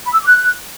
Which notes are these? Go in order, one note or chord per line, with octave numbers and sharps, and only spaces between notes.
B5
E6
D6
F#6